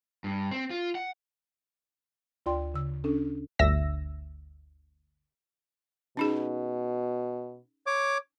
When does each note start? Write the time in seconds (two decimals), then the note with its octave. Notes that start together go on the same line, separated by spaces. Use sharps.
0.24 G2
0.51 C4
0.70 F4
0.95 F#5
2.46 D2 F4 D5 G5 C6
2.74 C#3 E6
3.04 C#4 D4 A4
3.59 G1 D2 E5 E6 A#6
6.17 B2 C#4 D#4 G#4
7.87 C#5 D6